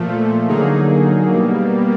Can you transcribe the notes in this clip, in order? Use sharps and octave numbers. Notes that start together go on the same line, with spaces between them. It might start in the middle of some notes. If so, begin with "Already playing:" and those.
Already playing: A#2 F3 A3
D3 F#3 A#3 D#4 G#4
B2 G3 A#3